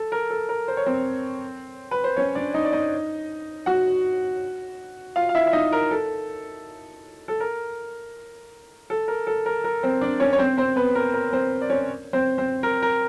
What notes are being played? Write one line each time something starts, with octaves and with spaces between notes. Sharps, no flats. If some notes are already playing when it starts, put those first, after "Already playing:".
Already playing: A4
A#4
A4
A#4
C5
C#5
C4 C5
B4
C5
C#4 C#5
D4 D5
D#4 D#5
D5
D#4 D#5
F#4 F#5
F4 F5
F5
E4 E5
E5
D#4 D#5
A#4
A4
A4
A#4
A4
A#4
A4
A#4
A#4
C4 C5
D4 D5
C#4 C#5
C#5
C4 C5
C4 C5
B3 B4
A#4
A#4
C4 C5
D5
C#4 C#5
C4 C5
C4 C5
A#4
A#4